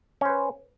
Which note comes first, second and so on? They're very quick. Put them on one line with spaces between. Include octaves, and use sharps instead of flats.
C#4 C5 B4